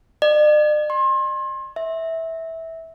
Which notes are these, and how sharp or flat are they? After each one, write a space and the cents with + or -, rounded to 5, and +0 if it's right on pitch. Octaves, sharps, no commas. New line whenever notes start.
D5 +45
C6 +35
E5 -15